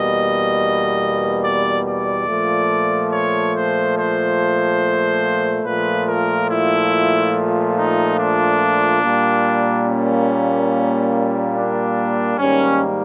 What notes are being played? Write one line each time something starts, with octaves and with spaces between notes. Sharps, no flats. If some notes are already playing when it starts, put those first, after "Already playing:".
Already playing: E2 B2 G3 A#3 D#5
D5
D5
A#2 F3 A3
C#5
C5
C5
A#2 F3 A3 B4
A#4
E4
D#4
D4
A#2 G3 A#3
C#4
D4
G#2 D#3 G3 A#3 C#4